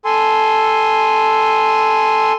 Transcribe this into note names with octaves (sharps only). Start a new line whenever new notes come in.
A4 G#5 C6